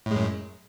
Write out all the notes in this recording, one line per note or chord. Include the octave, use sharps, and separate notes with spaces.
F#2 A2 G#3